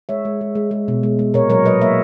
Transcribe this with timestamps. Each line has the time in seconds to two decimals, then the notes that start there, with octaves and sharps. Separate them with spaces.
0.09 G#3 C#5 E5
0.25 G#3
0.41 G#3
0.55 G#3
0.71 G#3
0.88 B2
1.03 G#3
1.19 G#3
1.34 A#2 A#4 C#5
1.50 F#3 A#4 C#5
1.65 F#3 B4 D#5
1.81 A#3 C#5 E5